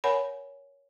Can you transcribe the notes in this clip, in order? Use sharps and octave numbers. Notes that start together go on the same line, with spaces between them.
A#4 C#5 F#5 G#5 B5